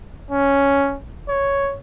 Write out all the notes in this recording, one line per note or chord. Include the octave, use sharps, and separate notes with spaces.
C#4
C#5